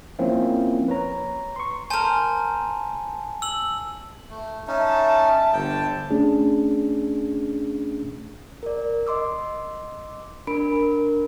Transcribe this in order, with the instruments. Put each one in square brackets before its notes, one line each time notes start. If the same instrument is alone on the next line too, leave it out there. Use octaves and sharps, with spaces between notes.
[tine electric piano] F3 A#3 C4 C#4 E4 F4
B4 C#5 A#5
C6 C#6
[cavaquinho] A#4 C5 [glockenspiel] G#5 A5
[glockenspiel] E6 F#7
[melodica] A3
[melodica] C#4 D#4 [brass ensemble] E5 A5
[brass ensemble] G1 D3 A5 [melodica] G5
[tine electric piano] A3 C#4 D4 G#4
[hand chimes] A#4 D5
D#5 C6 D6 E6
D4 A#4 B5 D7
D4 A#4